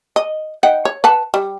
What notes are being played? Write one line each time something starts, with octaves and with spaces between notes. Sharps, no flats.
D#5
D#4 F#5 G5
C#5
B4 F#5 A5
G3